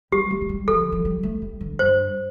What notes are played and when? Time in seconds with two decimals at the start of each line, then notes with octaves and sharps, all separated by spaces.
0.12 G3 G4
0.31 A3
0.41 A3
0.49 G3
0.68 F3 A4
0.80 D3
0.92 F3
1.05 G3
1.23 A3
1.42 G3
1.61 D3
1.79 G2 C5